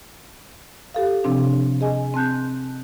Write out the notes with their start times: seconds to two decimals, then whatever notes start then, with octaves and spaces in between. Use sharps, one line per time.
0.94 G4 A4 F5
1.24 C3 F3 C4 D4
1.81 G#4 D#5 G#5
2.14 C4 A5 F#6 G6